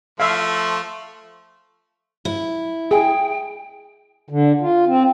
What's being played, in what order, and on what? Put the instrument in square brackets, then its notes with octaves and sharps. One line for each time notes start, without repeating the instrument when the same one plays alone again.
[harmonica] F3 A3 [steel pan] E5 F5
[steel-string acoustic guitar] E4
[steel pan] G#4 [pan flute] G5
[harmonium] D3
F4
C4